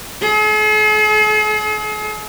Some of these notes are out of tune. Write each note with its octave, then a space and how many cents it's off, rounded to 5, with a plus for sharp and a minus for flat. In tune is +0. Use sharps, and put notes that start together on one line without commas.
G#4 +45